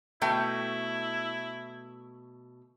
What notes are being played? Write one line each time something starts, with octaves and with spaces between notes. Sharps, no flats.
B2 A3 E4 G5